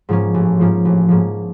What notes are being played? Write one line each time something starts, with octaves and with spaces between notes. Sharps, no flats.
G#2 F3 A#3 C#4
A1
G#2 F3 A#3 C#4
A1
G#2 F3 A#3 C#4